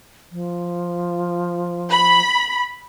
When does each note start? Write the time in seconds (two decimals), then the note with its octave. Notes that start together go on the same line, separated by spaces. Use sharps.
0.31 F3
1.90 B5